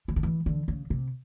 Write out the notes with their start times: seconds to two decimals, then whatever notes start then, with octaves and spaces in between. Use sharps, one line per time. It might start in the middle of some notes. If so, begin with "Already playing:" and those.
0.08 F3
0.16 D#3
0.23 E3
0.46 D3
0.68 C#3
0.90 C3